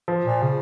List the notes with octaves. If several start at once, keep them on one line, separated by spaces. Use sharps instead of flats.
F3
A#2
C#3